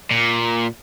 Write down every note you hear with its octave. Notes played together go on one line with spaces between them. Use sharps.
A#2